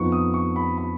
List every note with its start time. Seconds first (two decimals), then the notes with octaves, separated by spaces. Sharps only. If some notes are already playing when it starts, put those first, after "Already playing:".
Already playing: F2 F3 B3 D#4 C#6
0.12 D#6
0.34 C#6
0.56 B5
0.78 B5